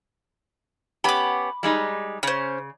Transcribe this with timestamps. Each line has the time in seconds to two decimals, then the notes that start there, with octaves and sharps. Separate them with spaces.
1.04 B3 C#4 G4 B5 D6
1.63 G3 G#3 D#4
2.23 C#3 C#4 C5